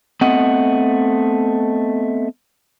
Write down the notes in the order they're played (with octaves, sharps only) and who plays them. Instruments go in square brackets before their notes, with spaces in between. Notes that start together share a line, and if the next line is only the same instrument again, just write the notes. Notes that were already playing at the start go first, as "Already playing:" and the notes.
[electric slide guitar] A3 B3 C4 D#5 F#5